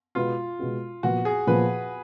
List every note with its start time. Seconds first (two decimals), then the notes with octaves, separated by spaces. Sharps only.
0.15 B2 G#3 B3 F4 F#4
0.59 B2 G#3 B3 F#4
1.03 A#2 F3 B3 F#4
1.25 G#4
1.47 A#2 F3 B3 B4